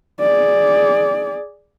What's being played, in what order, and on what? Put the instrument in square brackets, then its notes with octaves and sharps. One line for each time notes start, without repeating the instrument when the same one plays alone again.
[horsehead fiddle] G#4 D5